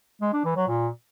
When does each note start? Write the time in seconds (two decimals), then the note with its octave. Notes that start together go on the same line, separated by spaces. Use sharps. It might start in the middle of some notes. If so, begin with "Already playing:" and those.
0.21 G#3
0.33 D4
0.45 E3
0.56 F#3
0.68 A#2